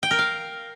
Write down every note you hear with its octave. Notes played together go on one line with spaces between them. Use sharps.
G5
A#4
F5